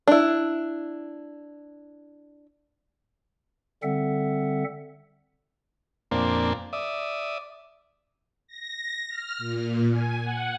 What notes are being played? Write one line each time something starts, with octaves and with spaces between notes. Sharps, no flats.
D4 E4
D3 G3 C4 A4 E5 F#5
F2 A#2 A#3 C4 D4
D5 E5 D#6
A#6
F6
A#2
G#5
F#5